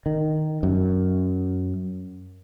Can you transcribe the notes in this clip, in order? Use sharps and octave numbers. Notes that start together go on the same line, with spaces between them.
D#3
F#2